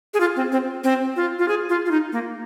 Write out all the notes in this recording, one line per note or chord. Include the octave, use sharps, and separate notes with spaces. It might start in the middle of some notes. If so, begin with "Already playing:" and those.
G#4
F4
C4
C4
C4
F4
F4
G#4
F4
F4
D#4
A#3